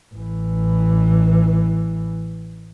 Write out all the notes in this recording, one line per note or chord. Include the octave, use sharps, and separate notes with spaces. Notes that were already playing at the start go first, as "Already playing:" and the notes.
A1 E3